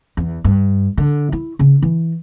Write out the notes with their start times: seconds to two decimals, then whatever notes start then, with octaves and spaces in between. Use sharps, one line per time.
0.17 E2
0.44 G2
0.98 D3
1.32 E4
1.59 C#3
1.82 E3